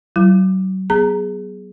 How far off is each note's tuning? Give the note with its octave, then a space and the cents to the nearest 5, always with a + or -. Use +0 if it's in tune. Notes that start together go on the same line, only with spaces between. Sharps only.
F#3 +35 E4 +35
B3 +0 G#4 +0 A#5 +0